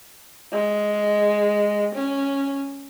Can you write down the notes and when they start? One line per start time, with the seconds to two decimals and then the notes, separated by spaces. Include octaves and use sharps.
0.52 G#3
1.95 C#4